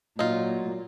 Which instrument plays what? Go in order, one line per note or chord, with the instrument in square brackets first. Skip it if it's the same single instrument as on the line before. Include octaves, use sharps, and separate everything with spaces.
[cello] A#2 [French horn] F#3 [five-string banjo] D#4 F4